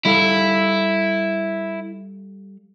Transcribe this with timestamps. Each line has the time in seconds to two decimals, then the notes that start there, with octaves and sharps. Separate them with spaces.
0.05 G3 E4 A4 F5